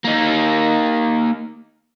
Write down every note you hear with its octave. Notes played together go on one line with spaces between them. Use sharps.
A#3 D#4